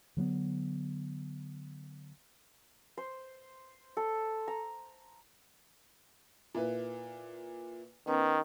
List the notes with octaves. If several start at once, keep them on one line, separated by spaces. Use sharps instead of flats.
D3 F#3 A#3 B3
C5
A4
A#5
A#2 E4 B4
D#3 B3 C#4